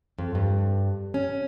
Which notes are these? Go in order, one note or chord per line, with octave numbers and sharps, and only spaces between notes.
F2
G2
C#4